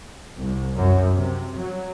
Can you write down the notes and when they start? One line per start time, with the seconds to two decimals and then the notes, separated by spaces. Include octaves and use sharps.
0.38 C2
0.77 F#2
1.14 C3
1.60 F#3